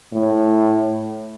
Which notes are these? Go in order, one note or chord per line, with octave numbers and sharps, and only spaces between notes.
A2